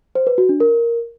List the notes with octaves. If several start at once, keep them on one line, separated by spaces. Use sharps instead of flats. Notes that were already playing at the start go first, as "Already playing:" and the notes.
C5
B4
F#4
D4
A#4